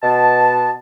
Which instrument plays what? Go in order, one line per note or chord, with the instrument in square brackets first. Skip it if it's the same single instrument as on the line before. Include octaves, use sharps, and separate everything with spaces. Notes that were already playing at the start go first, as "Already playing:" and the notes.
[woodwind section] B2 A5